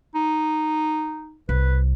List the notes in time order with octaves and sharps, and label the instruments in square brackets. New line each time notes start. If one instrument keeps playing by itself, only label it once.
[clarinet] D#4
[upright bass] C2 [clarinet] B4